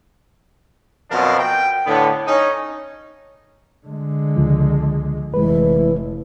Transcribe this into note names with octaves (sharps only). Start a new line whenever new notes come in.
F#2 B2 F3 C4 D4 A#4
G5
A2 D3 B3
C#4 D#4
D3 G#3
C#2 F3
F1 E3 G#3 B4